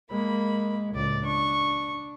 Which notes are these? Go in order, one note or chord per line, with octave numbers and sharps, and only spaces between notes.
G#3 A#3 B5
C#2 A2 D5
D4 C#6